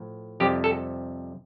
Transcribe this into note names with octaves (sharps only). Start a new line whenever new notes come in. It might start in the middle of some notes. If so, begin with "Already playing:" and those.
Already playing: A2 F3
F2 C3 G3 G4
A4